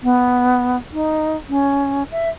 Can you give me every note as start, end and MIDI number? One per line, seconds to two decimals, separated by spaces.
0.01 0.76 59
0.92 1.36 63
1.49 2.03 61
2.11 2.29 76